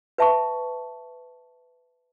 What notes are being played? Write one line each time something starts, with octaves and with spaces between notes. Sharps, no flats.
B4 E5 A5 C#6